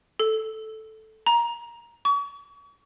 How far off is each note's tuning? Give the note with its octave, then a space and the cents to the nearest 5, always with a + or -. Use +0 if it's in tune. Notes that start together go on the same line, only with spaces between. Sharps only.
A4 -5
A#5 +15
C#6 +40